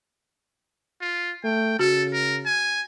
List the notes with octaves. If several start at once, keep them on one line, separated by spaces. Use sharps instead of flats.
F4
A3 G5
C#3 F#4 A4
A#4
G#5